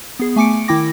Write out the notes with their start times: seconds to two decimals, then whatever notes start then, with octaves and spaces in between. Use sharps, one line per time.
0.19 B3 G#4
0.36 A3 G#5 D6 C#7 D7
0.68 D#3 E4 G5 D6 A#6